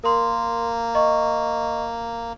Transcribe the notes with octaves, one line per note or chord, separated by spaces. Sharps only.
A#3 A#4 C6
D#5 C#6